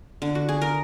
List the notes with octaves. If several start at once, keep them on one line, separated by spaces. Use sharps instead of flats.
D3
F#4
G#4
A#4